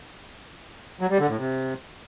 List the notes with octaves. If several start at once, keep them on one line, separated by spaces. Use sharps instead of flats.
F#3
G3
D3
A2
C3